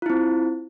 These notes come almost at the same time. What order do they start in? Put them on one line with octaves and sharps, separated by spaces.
F4 E4 C4